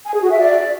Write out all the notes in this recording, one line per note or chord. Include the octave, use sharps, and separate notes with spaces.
G#5
G#4
F#4
E5
D5